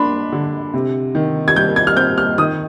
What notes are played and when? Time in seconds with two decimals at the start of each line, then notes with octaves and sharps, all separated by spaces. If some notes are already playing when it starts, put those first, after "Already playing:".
Already playing: D4 B5 C6
0.32 D3
0.74 C3
1.15 D#3
1.48 G#6
1.56 G3 G6
1.76 G#6
1.87 F6
1.97 C4 G6
2.18 F6
2.38 D#3 D#6